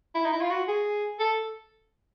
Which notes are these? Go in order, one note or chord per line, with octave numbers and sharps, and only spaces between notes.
E4
D#4
E4
F4
F#4
G#4
A4